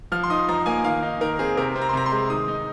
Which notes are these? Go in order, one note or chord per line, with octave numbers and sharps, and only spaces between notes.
F3 F6
C6
D#4 D#6
F3 A#5
A#3 G#5
D#3 F5
D#4
D#3 A#4
C4 G#4
C3 A#4
C4
A#5
C6
C3 A#5
C6
G#3
D#3 D#6
D#4